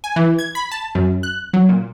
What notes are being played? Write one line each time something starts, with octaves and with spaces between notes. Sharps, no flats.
G#5
E3
G#6
B5
A5
F#2
F#6
F#3
A#2